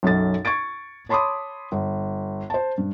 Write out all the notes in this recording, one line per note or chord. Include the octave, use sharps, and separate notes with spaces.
B1 F#2 A4 A6
C#6 G#6 A6 D7
C#5 A5 B5 C6 D6 D#6
G1
C5 A5
G2